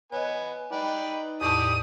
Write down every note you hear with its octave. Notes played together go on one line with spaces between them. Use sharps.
B3 C#5 D#5 G#5
D#4 B4 D5 G5
E2 A2 E3 G4 D5 A5 D#6